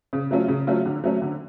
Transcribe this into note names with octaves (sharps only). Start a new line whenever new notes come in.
C#3
F#3 A3 C#4 F4
C#3
F#3 A3 C#4 F4
D3
F#3 A3 C#4
D3